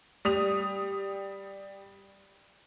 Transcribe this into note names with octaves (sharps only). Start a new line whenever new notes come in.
G3 D#6 F7